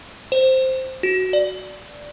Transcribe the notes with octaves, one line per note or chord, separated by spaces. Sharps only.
C5
F#4
D5